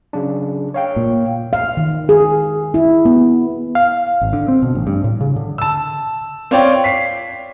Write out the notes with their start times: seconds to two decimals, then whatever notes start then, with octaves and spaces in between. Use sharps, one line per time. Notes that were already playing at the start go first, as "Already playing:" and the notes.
0.13 C#3 F#3 D4
0.74 C#5 F5 G5
0.96 A#2
1.53 F5
1.77 D#3
2.09 G#4
2.74 E4
3.05 B3
3.75 F5
4.21 G#1
4.33 D3
4.48 C4
4.62 B2
4.75 A1
4.87 G2
5.04 A2
5.21 C#3
5.36 D3
5.58 A5 E6
6.51 C4 F4 C#5 D5 G5
6.84 B6 C7